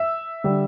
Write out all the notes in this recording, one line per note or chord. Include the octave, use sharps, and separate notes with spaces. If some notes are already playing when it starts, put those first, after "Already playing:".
Already playing: E5 E6
D3 G3